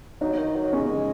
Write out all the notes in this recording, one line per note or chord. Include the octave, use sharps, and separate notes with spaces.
F#3 D#4
D#3
F#3
G#3 C#4